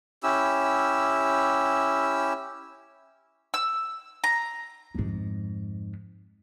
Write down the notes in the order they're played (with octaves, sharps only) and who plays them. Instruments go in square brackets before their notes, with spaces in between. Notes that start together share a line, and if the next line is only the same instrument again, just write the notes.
[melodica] C#4 E4 G4 E6
[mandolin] E6
A#5
[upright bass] F2 G#2